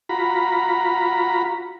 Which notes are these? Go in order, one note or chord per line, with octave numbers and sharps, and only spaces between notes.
F4 F#4 A#5 B5